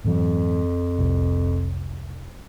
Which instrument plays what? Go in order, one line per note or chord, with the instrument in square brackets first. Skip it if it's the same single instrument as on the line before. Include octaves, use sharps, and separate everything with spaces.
[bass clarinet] F2 [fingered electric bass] G#2 E3 F#3
[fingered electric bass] F1 C2